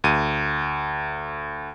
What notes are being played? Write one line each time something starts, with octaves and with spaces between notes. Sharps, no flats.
D2 D#7